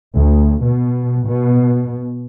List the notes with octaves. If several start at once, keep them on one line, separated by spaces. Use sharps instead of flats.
D2
B2
B2